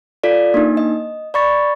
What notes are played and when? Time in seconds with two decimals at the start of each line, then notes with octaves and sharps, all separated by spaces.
0.24 F4 A4 D5
0.54 A#3 D4 D#4
0.77 D#5
1.34 D5 B5 C#6 A6